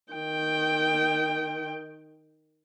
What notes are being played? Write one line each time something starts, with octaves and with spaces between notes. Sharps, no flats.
D#3 G5